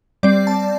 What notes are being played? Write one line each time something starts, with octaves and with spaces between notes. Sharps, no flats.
G3 C4 D5
A5